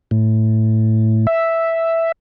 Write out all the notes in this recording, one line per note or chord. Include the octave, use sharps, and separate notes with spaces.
A2
E5